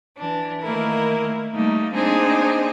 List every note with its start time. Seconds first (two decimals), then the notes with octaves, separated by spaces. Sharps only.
0.16 E3 D4
0.62 D#3 A3 A#3 E4 A#4
1.52 G3 A3 A#3 D#4
1.93 A#3 C4 D4 D#4 G#4 C5